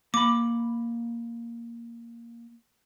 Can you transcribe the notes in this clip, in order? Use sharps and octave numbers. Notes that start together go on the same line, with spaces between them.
A#3 B5 D6